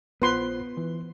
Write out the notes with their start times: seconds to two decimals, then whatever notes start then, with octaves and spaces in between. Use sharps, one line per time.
0.22 A#1 B3 F4 B4 C5 C6
0.77 E3